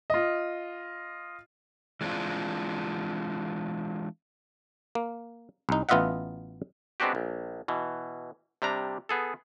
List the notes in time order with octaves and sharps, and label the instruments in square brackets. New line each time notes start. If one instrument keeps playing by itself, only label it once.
[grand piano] F4 D#5
[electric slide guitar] E3 G#3 C4 D4 F4
[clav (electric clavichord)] A#3
C2 D#4
A1 B3 F4 D#5 E5 F#5
G#3 B3 C4 D4 F#4 G4
A#1
B2 E3
C3 G3 D4 A#5
B3 G#4 A4